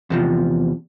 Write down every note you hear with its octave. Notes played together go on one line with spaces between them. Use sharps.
E2 C3 F3